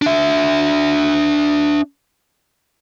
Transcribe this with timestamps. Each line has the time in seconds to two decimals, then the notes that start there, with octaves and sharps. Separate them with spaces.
0.02 D4 E5